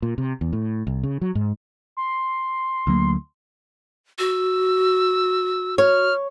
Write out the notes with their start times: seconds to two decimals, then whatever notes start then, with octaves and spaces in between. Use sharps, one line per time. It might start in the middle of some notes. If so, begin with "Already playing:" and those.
0.02 A#2
0.18 C3
0.41 E2
0.53 A2
0.87 C2
1.03 C#3
1.21 F#3
1.35 G#2
1.97 C6
2.87 D2 F#3 A#3
4.19 F#4 E6
5.78 C#5 F6